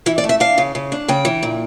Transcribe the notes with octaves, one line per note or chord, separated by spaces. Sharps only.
E3 E4
D5
A3
E5
D4 F5
C#3
C#3
D4
C#3 G5
E3
A#2